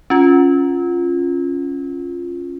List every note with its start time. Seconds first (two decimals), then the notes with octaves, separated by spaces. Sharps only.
0.10 C#4 F4